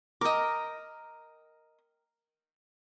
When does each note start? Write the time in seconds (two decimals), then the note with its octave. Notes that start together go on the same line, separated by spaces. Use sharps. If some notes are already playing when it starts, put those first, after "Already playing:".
0.21 A#4 D#5 G5 D6